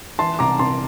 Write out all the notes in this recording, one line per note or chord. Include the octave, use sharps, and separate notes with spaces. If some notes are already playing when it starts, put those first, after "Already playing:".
E3 A5 C6
C2 A#5 D6
C3 A5 C6